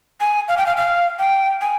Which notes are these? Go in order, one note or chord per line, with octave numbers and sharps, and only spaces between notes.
G#5
F5
G5
F5
F5
G5
G#5